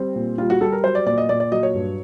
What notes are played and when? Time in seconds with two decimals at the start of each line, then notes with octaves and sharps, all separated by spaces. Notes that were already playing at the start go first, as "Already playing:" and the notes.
Already playing: G3 C4
0.16 A#2
0.38 G3 F4
0.50 F#4
0.61 G3 A4
0.72 A#4
0.84 F#3 C5
0.95 D5
1.06 A#2 D5
1.18 D#5
1.29 A#2 D5
1.40 D5
1.52 F#3 D#5
1.63 C#5
1.74 G2